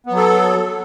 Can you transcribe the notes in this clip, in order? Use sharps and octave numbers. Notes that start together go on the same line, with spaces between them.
F#3 B3 A4